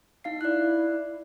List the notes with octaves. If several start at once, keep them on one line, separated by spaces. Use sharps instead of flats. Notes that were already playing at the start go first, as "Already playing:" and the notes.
D#4 F5 C7
E4 D5 F#6